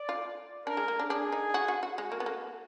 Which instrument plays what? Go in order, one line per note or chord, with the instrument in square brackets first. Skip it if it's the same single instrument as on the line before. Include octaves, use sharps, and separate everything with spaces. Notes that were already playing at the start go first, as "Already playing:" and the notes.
Already playing: [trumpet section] D5
[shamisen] F4
[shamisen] D4 [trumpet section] A#4
[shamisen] G#3
A#3
D4
[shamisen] D4 [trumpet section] G#4
[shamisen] D#4
F#4
F#4
F#4
[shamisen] G#3 [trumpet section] F#4
[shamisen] A#3
B3
A#3